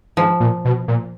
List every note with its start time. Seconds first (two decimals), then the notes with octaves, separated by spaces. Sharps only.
0.17 G#2 F3
0.40 A#2
0.65 B2
0.88 A#2